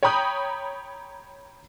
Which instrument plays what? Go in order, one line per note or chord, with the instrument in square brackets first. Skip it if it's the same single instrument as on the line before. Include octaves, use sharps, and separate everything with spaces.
[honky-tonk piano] C#5 G5 A#5 B5 D#6 G6